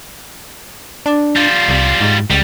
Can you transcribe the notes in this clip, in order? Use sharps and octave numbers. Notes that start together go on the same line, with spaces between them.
D4
G3 F4
C2
G#2
C#2 G3